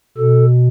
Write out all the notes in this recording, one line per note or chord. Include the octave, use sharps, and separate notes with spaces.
B2 A4